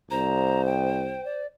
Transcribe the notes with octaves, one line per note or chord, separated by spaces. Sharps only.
C2 C5 A#5
G5
D5